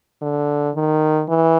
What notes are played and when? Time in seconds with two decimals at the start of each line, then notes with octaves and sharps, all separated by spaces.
0.22 D3
0.75 D#3
1.29 E3